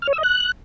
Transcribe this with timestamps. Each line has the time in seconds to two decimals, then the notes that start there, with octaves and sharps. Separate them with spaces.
0.02 F6
0.07 C#5
0.13 E6
0.18 D#5
0.23 F#6